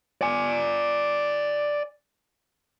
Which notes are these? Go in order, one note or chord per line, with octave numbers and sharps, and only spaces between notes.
D5 G#5